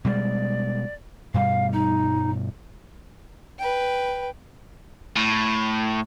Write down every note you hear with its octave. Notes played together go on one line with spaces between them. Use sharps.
B2 G3 G#3 D5
G2 B2 G3 F5
D#4
B4 G5
A2